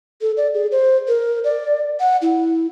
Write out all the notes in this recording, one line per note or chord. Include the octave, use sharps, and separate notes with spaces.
A4
D5
G#4
C5
A#4
D5
F#5
E4